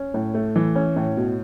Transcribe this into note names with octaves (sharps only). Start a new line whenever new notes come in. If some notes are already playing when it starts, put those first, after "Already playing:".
Already playing: C#4
A2
A3
E3
C#4
A2
B2